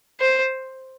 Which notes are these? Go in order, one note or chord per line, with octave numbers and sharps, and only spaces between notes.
C5